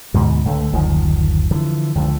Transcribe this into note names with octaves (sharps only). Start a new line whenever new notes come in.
D2 G#2 B2
C#2 D3 A3
F#1 D2 D#3 F3
D3 E3 F3
C#2 D3 F3